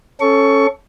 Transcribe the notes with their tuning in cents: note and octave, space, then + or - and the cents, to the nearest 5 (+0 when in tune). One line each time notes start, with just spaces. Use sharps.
C#4 -15 A4 +0 C#6 +15